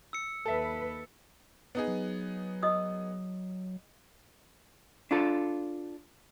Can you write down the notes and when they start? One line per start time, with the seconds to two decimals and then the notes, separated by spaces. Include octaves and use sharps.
0.13 E6 C#7
0.46 D#2 A4 B4 E5
1.75 B3 D#4 G#4
1.88 F#3
2.63 D#5 D#6 E6
5.11 D4 F4 A4